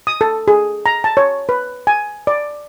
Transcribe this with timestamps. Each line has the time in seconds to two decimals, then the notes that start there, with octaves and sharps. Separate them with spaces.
0.07 D#6
0.21 A4
0.48 G#4
0.86 A#5
1.04 A5
1.17 C#5
1.49 B4
1.87 G#5
2.27 D5